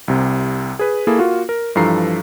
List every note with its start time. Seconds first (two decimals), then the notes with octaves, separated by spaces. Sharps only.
0.08 C2 C3
0.79 G#4 B4
1.07 A#3 E4 G#4 A4
1.19 A#3 F4 F#4
1.49 A#4
1.75 G2 E3 F3 A4 A#5 C7